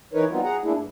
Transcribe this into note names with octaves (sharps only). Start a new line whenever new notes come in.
E3 D#4 A#4 B4 C#5
F#3 G3 B3 C4 D#4 F4
G#4 F#5 A#5
A3 A#3 D4 E4 G#4
G2